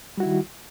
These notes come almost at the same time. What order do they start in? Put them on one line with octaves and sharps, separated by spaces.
G3 F#4 E4 D#3